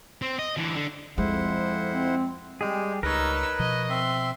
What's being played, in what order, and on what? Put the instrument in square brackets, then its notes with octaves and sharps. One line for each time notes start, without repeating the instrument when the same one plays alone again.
[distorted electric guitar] C4
D#5
D3 E3
D3
[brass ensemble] F2 [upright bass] G#3 [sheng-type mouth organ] E4 C5 F#5
[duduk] C4
[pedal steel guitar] G3 G4 G#4 [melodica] G#3
[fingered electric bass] C#2 [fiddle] D#4 E6 [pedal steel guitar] A#4 C#5 [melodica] B4
[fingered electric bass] B2 F3 [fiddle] D#5
[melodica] C4 E5 [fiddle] C6